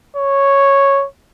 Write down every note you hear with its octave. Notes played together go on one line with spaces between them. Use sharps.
C#5